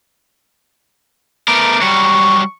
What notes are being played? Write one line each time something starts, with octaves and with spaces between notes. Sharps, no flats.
A3 B3 A#4 D6
F#3 G3 C#6